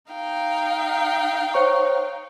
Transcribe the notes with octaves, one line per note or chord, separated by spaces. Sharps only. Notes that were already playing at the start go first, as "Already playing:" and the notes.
D#4 F5 G5
C5 C#5 C#6